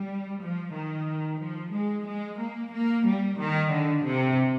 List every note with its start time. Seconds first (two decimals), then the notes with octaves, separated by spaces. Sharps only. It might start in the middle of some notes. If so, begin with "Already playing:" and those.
Already playing: G3
0.41 F3
0.73 D#3
1.39 F3
1.72 G#3
2.05 G#3
2.38 A#3
2.72 A#3
3.05 G3
3.38 D#3
3.70 D3
4.04 C3